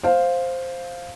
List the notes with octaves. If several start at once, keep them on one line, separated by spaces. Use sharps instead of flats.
C5 F5